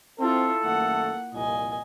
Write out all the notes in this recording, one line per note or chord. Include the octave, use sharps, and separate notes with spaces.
C4 E4 F4 A4
F#2 D#3 A3 A#3 F#5
C2 F2 A#2 D#5 G#5